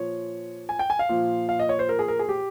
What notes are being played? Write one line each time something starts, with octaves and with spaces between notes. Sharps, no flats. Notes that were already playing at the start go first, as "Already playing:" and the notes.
Already playing: A#2 F3 C#5
G#5
G5
G#5
F5
A#2 F3
F5
D#5
C#5
C5
A#4
G#4
A#4
G#4
G4